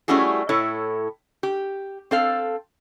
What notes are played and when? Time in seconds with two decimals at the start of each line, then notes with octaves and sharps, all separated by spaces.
0.08 G3 A3 C#4 E4 F#4 G#4
0.49 A2 E4 A4 C#5
1.43 G4
2.11 C4 A4 F5